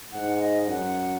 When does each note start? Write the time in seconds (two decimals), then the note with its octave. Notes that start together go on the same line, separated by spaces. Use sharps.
0.12 G#2 F#5
0.40 D#5
0.68 F#2 F#5